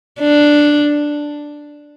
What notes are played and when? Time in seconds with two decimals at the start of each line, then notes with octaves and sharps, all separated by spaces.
0.20 D4